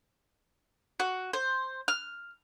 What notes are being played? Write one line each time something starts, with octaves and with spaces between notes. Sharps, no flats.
F#4
C5
F6